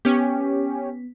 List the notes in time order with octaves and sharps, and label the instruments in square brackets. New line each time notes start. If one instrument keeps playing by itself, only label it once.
[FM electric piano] B3 [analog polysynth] C#4 G4